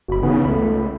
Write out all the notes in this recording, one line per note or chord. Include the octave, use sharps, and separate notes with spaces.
F#1 F#4 B5
C#3 E3 B3 D#4
C#2 A3 B5